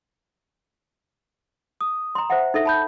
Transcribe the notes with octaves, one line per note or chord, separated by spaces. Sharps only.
D#6
A#5 C6
C5 E5 F#5
D#4 A4 E5
A5 B5 G6